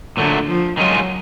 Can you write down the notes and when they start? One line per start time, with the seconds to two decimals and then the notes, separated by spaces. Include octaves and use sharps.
0.17 A#2 D3 F#3 A3
0.48 F3
0.77 D#3 F#3 G#3 C#4 F4